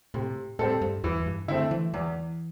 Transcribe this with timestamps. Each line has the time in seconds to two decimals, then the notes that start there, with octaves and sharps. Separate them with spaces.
0.14 A2 C3
0.59 A2 G3 C4 A4
0.81 G2
1.04 E2 E3
1.26 G2
1.48 D3 A3 C4 E4
1.71 E3
1.94 E2 E3